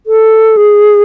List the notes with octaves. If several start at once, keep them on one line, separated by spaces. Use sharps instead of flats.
A4
G#4